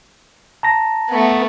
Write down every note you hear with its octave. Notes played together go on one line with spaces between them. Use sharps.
A5 A#5 A#6
A3 B3